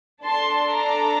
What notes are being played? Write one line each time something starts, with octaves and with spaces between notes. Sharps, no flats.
D4 A4 A5 C6
A#5 D6